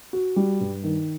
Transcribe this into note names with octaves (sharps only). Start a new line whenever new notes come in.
F#4
G3
G2
D#3